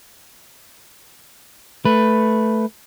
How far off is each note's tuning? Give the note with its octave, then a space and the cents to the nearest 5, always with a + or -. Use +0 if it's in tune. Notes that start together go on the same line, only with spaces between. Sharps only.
A3 +0 B4 +0